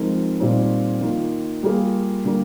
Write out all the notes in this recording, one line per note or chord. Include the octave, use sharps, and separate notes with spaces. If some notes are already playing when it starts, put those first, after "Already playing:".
Already playing: F3 G#3 C4 D#4 A#4
A#2 G3 C4 D#4
D#3 A#3 F4
G3 A#3 F4 G#4
D3 G3 A#3